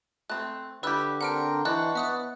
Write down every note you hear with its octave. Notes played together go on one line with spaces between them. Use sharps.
A3 C4 F#6
D3 G3 E4 G4 B4 E6 F#6
C4 D4 A#4 F#5 F6 D7
E3 D4 C5 D#5 F#5 A5 C#6 F#6
B3 E5 D#6 F#6